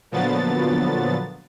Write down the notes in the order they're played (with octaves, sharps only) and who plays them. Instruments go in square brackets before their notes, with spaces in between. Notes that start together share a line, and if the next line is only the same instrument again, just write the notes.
[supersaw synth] A#2 D3 F3 F#3 B3 A6